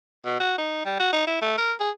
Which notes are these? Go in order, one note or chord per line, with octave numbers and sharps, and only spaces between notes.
B2
F#4
D#4
G3
F#4
D#4
E4
A3
A#4
G#4